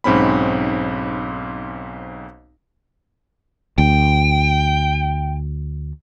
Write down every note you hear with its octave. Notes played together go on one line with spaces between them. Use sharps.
B1 G#2 C4 C#4 B5
D2 G5